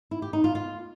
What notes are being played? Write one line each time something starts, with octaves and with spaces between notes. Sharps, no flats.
E4
G4
D#4
F4
F4